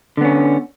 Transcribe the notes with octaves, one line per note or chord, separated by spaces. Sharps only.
D3 B3 C#4